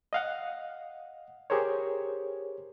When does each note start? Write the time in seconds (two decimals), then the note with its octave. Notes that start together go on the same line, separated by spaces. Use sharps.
0.13 D#5 F5 F#5
1.50 G4 G#4 A#4 C5 C#5